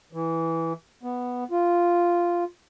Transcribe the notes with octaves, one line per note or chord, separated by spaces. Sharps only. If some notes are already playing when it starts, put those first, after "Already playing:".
E3
B3
F4